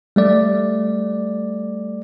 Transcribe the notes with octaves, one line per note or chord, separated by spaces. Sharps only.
G3 A3 D5